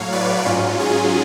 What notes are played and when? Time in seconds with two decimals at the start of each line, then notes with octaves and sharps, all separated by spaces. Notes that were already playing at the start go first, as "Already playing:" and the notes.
Already playing: A2 F#3 C#5 F5
0.12 B4 D5
0.46 G#2 F#3 C#4 F4
0.80 F4 G#4